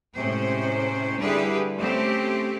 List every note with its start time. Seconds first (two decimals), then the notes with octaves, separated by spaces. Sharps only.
0.15 A2 C3 G#3 C#4 C5
1.19 D3 G3 E4 G4 G#4 B4
1.78 A3 C4 C#4 G4